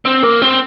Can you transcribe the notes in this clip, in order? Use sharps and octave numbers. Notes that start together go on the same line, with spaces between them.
C4
A#3
C4